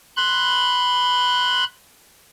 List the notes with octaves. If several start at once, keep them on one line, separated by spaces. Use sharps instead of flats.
B5 C6 F#6